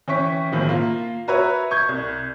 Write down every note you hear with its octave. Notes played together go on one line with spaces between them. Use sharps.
E3 C#4 G5 C#6 B6
B1 A2 D#3 F3
A#3 F4
F#4 A#4 B4 C#5 E5
C#6 G6 G#6
C2